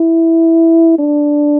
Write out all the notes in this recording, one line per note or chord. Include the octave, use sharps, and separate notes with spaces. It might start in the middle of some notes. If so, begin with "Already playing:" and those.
Already playing: E4
D4